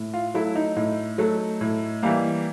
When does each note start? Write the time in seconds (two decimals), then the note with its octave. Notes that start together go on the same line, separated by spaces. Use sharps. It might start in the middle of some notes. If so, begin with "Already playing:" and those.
Already playing: A2
0.14 F4
0.34 F#3 A3 E4
0.56 D#4
0.76 A2 D#4
1.18 F#3 A3
1.61 A2
2.03 E3 G3 A#3